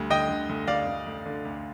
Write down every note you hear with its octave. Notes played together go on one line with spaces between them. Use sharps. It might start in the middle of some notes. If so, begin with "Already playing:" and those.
Already playing: D2 D3 G3
D3 D#5 G5
D3
D2
D2 D5 F5
D2
D2
D3
D2